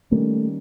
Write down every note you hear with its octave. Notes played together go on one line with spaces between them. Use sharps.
D#3 G3 A3 A#3 C#4